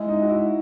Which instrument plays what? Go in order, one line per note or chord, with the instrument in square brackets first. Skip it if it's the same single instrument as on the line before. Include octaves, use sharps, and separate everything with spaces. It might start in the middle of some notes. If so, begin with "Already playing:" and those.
Already playing: [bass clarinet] G#3 [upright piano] E4
[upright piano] D#4
F#4
E4